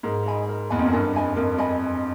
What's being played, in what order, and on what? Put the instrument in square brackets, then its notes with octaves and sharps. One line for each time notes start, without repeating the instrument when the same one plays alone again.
[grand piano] G#2 [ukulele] A#4
[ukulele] D#5 G#5 B5
A#4
[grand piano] E2 [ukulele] D#5 G#5 B5
[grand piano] F2
F#2
[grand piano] G2 [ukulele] A#4
[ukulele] D#5 G#5 B5
[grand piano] F2 [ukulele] A#4
[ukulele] D#5 G#5 B5